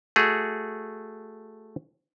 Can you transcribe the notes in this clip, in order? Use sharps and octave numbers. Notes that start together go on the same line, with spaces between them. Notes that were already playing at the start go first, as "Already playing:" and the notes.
A3 F#4 G#4